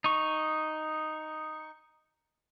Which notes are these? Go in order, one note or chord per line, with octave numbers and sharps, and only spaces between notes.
D#4 C#6